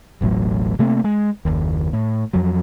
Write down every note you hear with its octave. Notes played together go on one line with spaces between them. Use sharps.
E1 A1 A2 F#3
C3 A3 A#3 C4
G#3
F#1 D#2
A2
F2 F3 F#3